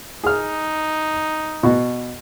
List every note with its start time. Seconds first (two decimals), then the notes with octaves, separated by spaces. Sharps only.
0.24 D#4 G#4 F6
1.63 B2 F#4